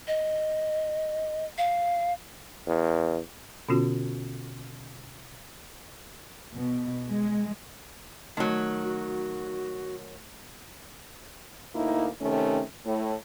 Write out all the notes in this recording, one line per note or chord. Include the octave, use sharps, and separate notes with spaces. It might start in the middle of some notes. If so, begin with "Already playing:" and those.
D#5
F5
E2
B2 D3 B3 C#4 F4 F#4
B2
G#3
D#3 F#3 A3
F#4
D2 A#3 D#4 E4
C3 D#3 A3 C#4
A2